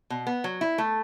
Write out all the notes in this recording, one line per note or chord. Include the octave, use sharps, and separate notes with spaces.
B2
B3
F#3
E4
A3